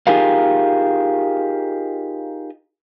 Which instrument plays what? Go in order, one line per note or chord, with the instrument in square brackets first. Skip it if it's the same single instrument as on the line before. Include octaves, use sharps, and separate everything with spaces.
[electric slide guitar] D#4 F4 G4 G#4 A#4 F5